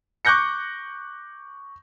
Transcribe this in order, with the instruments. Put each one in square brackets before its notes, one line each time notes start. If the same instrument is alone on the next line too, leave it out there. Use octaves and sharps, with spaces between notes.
[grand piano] C#6 D6 F#6 G6 A#6 C#7